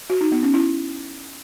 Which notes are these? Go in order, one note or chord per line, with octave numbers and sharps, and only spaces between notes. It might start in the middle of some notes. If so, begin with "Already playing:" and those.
F#4
D#4
B3
C#4
E4